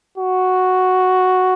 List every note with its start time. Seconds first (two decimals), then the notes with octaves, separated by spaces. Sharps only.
0.18 F#4